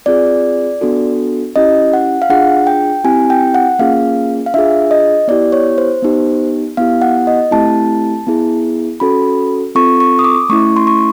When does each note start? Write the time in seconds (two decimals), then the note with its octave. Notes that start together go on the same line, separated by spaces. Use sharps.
0.06 C4 F4 G#4 D5
0.81 B3 D4 F#4 A4
1.56 C#4 E4 G4 D#5
1.93 F#5
2.22 F5
2.30 D4 F4 G#4 F#5
2.67 G5
3.04 C4 E4 G4 G#5
3.30 G5
3.54 F#5
3.79 A#3 C#4 F4 G#4 F5
4.46 F5
4.54 D4 F4 G#4 E5
4.91 D#5
5.28 B3 E4 G4 D5
5.52 C#5
5.78 C5
6.03 B3 D#4 G4
6.77 B3 E4 G4 F5
7.02 F#5
7.27 D#5
7.51 A3 C4 E4 G4 A5
8.27 B3 E4 G#4
9.00 C#4 F#4 A4 B5
9.75 C4 F4 A4 C#6
10.00 C#6
10.19 D#6
10.24 D6
10.50 A3 C#4 E4 C#6
10.76 C6
10.87 C#6